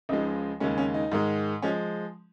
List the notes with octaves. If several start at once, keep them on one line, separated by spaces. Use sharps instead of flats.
C#2 C#3 F3 G#3 D#4
D#2 C#3 G#3 C#4
C#4
D#4
G#2 D#3 G#3
F3 G#3 C#4